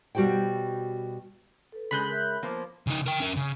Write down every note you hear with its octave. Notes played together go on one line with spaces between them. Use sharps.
B2 G3 F#4 G4 C5 G5
A4 B4
C#3 G#3 B5 F#6 G6
A#4 E5
F3 A#3 B3 C5 D6
C#3 D#4
A#4 G5
C#4 A#4
C#3